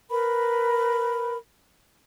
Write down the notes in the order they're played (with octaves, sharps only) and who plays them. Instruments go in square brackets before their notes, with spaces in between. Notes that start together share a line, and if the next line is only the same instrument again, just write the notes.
[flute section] A#4 B4 B5